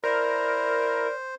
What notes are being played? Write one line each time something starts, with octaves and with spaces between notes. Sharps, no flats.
E4 A#4 C5 D5